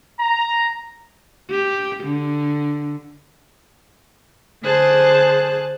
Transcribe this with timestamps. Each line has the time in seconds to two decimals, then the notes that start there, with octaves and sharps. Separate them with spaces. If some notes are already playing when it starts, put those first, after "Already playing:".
0.20 A#5
1.50 G4
2.04 D3
4.62 D3 G#4 C5 A5 F#6